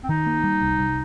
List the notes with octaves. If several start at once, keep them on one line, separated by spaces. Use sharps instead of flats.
C4
D#3 D#4
A#3
G3
C2
C2